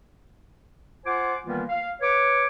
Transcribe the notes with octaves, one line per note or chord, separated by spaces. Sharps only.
F4 C5 F#5 G#5 D6
D#3 E3 G3 A#3 B3 F4
F5
B4 C#5 D6